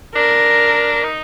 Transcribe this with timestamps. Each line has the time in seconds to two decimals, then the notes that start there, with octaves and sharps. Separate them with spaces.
0.15 D4 A#4
1.04 D#4